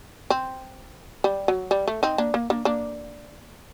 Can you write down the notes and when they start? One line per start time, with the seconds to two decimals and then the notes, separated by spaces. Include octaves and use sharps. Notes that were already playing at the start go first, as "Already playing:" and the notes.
0.30 C4
1.24 G3
1.48 F#3
1.71 G3
1.88 A3
2.03 C4 D#4
2.18 A#3 D4
2.34 A#3
2.50 A#3 D4
2.65 A#3 D4